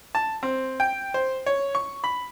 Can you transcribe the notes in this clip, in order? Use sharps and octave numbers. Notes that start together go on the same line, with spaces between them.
A5
C4
G5
C5
C#5
C#6
B5